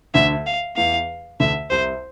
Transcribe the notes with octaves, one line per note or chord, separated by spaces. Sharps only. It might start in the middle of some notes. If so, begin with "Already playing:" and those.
D2 D3 E5
F5
E2 E3 F5
D2 D3 E5
C2 C3 C5